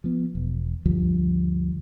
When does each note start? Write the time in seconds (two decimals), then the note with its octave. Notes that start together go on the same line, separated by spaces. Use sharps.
0.04 F3 B3
0.35 E1
0.85 D2 G2 F3 G3